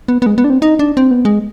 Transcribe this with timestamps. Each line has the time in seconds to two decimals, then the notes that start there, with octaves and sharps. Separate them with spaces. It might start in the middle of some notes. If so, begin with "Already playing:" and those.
0.08 B3
0.22 B3
0.26 G#3
0.38 B3
0.44 D4
0.50 C4
0.62 D#4
0.79 D4
0.97 C4
1.11 B3
1.25 G#3